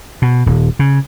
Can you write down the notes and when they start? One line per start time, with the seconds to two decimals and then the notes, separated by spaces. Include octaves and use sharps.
0.22 B2
0.46 D#1
0.79 C#3